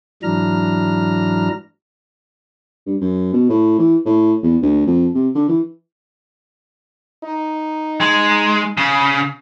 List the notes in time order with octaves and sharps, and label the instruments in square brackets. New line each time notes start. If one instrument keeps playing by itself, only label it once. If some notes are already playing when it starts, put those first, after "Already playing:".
[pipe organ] G#2 E3 F#3 D4 A#5 F6
[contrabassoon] G2
F#2
B2
A2
E3
A2
E2
D2
F2
C3
D3
E3
[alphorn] D#4
[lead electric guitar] G#3
C#3